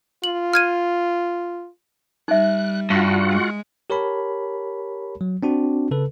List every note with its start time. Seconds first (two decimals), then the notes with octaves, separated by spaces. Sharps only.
0.24 F4 F#7
0.53 F6 G#6 D#7
2.28 G3 D#4 E5 F#6
2.90 G2 F4 F#4 F#5
3.29 G#3
3.90 G4 A#4 C#5 A5 B5
5.21 F#3
5.43 C4 D4 F#4
5.91 C#3 A4 B4